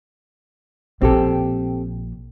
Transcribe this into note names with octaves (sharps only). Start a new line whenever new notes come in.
A#1 C4 G4 A4